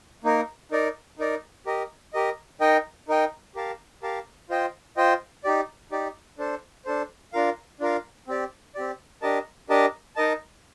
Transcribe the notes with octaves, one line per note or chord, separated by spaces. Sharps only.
A#3 D#4 A#4
D#4 A#4 D5
D#4 A#4 D5
G4 A#4 D#5
G4 A#4 D#5
D#4 A#4 D#5 G5
D#4 A#4 D#5 G5
G4 A#4 F5 A5
G4 A#4 F5 A5
F4 C5 D#5 G5
F4 C5 D#5 G5
D#4 G4 D5
D#4 G4 D5
D4 A4 C5
D4 A4 C5
D4 F4 A#4 F5
D4 F4 A#4 F5
C4 G4 D5
C4 G4 D5
D4 G4 A#4 D#5 A5
D4 G4 A#4 D#5 A5
D#4 A#4 D#5 A5